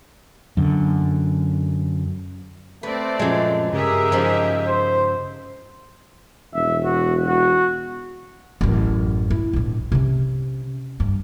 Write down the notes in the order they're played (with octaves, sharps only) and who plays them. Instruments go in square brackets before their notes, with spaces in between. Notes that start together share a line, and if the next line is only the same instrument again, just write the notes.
[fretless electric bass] F#2 D3
[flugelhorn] A3 [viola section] C4 D5 [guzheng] B4
[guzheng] F#2 G#3 [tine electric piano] A#2 F3 F4
[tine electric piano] G2 C#3 C#4 [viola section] G4 G#4 E5 [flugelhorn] A#4
[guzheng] F3 D#4
[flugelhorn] C5
[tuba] E1 [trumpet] E5
[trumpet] F#4
F#4
[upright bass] A1 F#2
E4
A#1 G#2
C3 C#4
G2